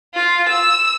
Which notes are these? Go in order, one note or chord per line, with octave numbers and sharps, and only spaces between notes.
F4
E6